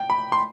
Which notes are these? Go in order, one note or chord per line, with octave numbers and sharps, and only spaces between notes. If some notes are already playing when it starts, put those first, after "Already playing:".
Already playing: G5
B5
C6